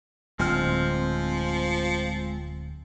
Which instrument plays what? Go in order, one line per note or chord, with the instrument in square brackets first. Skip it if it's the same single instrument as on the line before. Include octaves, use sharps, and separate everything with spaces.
[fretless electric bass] D1 [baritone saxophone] F3 [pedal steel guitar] G#3 C4 F6